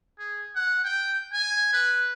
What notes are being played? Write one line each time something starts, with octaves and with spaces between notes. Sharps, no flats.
G#4
F#5
G5
G#5
B4